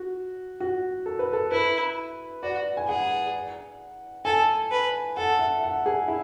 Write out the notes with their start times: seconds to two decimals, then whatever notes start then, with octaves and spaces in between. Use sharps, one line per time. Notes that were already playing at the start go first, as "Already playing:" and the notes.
Already playing: F#4
0.60 F#4
1.06 A4
1.19 B4
1.33 A4
1.52 E4 B4
2.43 F#4 D5
2.77 G#5
2.88 G#4 F#5
4.25 A4 G#5
4.71 B4
5.17 A4 F#5
5.39 E5
5.63 F#5
5.86 G#4
6.08 E4